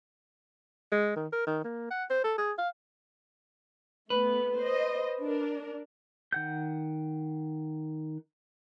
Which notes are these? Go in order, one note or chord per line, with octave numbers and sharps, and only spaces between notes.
G#3
D#3
A#4
D#3
A#3
F#5
C5
A4
G#4
F5
A3 B3 B4
C5 D#5
D4 A#4
D#3 F#5 G6